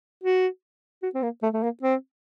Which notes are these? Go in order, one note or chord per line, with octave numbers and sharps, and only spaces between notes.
F#4
F#4
C4
A#3
A3
A3
A#3
C4